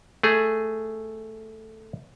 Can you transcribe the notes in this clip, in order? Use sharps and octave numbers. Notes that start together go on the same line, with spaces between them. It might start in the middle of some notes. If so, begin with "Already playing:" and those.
A3 G#4